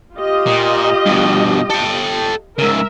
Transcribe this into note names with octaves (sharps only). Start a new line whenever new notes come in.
F4 G4 D#5
A#2
G2 B2
A4 G5
G#2 C#3 A#4 E5